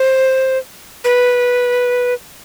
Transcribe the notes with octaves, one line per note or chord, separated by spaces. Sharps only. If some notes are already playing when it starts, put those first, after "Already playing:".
Already playing: C5
B4